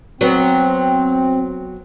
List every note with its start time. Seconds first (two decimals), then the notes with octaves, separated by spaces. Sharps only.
0.21 F#3 B3 C4